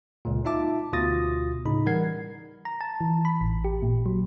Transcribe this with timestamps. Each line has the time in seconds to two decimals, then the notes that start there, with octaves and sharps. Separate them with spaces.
0.25 C#2 A#2
0.45 D#4 F4 E5 A5 D6
0.93 D2 B2 F4 D#6 A6 A#6
1.65 A2 C#3 D#4 B5
1.86 E3 G3 A#4 F#5 G#6 C7
2.65 A#5
2.81 A5
3.01 E3
3.25 B5
3.41 A1
3.64 G4
3.82 A#2
4.06 F#3